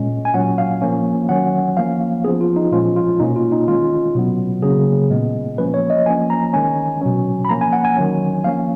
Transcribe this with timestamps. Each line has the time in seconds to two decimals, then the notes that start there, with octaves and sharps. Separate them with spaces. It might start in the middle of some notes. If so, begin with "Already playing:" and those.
Already playing: A#2 G#3 C#4
0.25 G#5
0.34 A#2 F#3 C#4 F#5
0.58 F5
0.82 F3 A#3 C#4
1.29 D#3 F#3 C#4 F#5
1.77 F3 A#3 C#4 F5
2.24 F3 B3 G#4
2.41 F4
2.56 D#4
2.72 A#2 F3 G#3 C#4 F4
2.96 F4
3.20 B2 A#3 C#4 D#4
3.36 F4
3.52 D#4
3.68 D#3 G#3 C#4 F4
4.15 B2 F#3 B3
4.63 C#3 F#3 A#3 C#4 G#4
5.11 A#2 G#3 B3
5.58 F3 A#3 C#4 B4
5.74 C#5
5.90 D#5
6.06 F3 A#3 C#4 G#5
6.30 A#5
6.53 D#3 G#3 C#4 G#5
7.01 B2 F#3 C#4
7.45 B5
7.49 F3 A#3 C#4 A#5
7.61 G#5
7.73 F#5
7.85 G#5
7.97 D#3 F#3 C#4
8.44 F3 A#3 C#4 F5